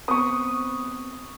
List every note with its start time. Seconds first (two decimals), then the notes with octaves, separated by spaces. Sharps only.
0.08 B3 C4 B4 C#6 D#6